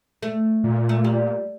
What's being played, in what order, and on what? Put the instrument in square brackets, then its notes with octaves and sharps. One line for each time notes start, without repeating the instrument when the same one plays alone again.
[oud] A3
[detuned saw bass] A#2
[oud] A3
G3